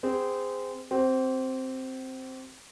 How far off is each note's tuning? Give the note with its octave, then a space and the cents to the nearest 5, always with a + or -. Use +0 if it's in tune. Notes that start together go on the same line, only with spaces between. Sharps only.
C4 -25 G#4 -25
C4 +0 G4 -45